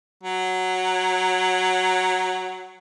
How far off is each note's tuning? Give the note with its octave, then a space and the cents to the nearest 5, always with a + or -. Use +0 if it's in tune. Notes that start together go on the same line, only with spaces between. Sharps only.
F#3 +0